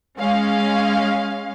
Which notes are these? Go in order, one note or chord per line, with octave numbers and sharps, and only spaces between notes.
G#3 C#4 F5